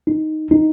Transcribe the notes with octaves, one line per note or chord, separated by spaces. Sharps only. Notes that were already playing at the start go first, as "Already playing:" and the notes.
D#4
D#4